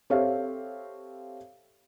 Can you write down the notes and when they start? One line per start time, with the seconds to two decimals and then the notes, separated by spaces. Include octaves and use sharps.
0.10 C4 G4 A4 C#5 E5 F5